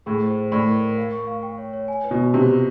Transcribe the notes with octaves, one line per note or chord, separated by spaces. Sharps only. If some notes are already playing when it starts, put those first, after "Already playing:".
A2 G#4
C5
C5
A2 D5
A#4
A#4
F5
C#6
F5
G5
C#5
C#5
G#5
B4
B2
F#4
C3 F4
F4